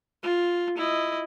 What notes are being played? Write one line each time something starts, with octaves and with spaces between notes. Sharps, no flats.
F4
E4 D#5